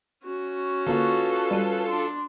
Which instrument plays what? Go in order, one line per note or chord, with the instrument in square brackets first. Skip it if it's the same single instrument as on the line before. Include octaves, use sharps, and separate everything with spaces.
[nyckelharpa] C#4 F#4
[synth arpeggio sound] D3 A#3 [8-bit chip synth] F4 A4 [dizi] B4
[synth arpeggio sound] G3 D#7
[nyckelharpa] D4 [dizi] C6